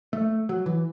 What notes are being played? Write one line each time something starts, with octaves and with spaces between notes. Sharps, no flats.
A3
F#3
E3